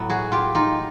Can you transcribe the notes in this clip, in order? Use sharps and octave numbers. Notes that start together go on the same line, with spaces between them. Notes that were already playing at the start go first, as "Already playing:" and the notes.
Already playing: A2 F#3 B3
F#4 G#4
F4 G4
D#4 F4